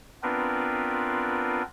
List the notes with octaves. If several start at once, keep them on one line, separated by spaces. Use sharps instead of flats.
B3 C4 D4 F4 A#4 B4